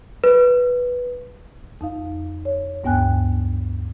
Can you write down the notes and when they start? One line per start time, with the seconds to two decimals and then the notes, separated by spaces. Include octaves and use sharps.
0.24 B4
1.81 F2 D#4 F5
2.45 C#5
2.84 D2 G2 B3 G5 G#5 F#6